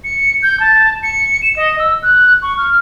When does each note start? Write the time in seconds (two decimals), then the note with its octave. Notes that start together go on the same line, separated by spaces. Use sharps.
0.04 C#7
0.43 G6
0.60 A5
1.03 C#7
1.42 E7
1.56 D#5
1.79 E6
2.03 F#6
2.42 C#6
2.58 F6